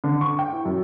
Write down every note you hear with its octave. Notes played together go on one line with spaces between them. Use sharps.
D3
C#6
G5
E4
F#2